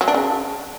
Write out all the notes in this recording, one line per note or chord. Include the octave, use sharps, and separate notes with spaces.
F#3
D4
C#3